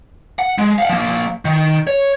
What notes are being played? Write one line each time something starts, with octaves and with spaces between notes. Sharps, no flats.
F#5
G#3
F5 F#5
F3 A#3
D#3
C#5